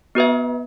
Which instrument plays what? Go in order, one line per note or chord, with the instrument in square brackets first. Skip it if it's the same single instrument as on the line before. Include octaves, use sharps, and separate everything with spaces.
[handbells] B3 F#4 B4 E5